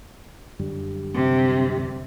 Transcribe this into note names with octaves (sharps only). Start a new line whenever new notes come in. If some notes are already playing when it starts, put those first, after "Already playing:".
F#2 D3 G3
C3